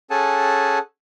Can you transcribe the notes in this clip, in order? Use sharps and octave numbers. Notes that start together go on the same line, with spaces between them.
C#4 G#4 A4 F#5 G#5 A5